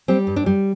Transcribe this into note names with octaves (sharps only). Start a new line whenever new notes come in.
G3 C4
G2
D4
G3